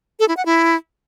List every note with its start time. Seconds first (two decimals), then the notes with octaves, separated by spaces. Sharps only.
0.20 A4
0.28 E4
0.37 F#5
0.46 E4